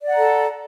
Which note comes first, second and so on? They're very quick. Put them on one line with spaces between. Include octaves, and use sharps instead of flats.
D5 F#5 A#5 A4